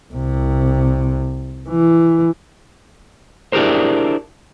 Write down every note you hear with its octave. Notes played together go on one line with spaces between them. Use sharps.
C2 C3
E3
D4 E4 G4 G#4 A#4 C5